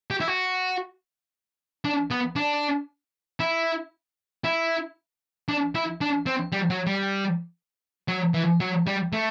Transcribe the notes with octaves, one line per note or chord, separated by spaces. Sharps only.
G4
E4
F#4
D4
B3
D4
E4
E4
D4
E4
D4
C4
G3
F#3
G3
F#3
E3
F#3
G3
A3